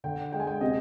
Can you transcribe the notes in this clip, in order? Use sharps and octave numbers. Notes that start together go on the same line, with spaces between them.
D3 G5
G#3 G5
G#5
G5
C3 D#5